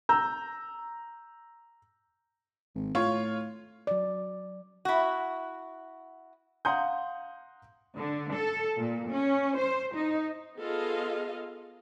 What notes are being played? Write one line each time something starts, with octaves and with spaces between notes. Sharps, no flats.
A#5 E6 G6
G#1
A2 F4 C#5
F#3 D5
E4 F#4
F5 F#5 A#5 C6 D#6 G6
D3
A4
A#2
C#4
C5
D#4
B3 F4 G#4 A4 D#5 F5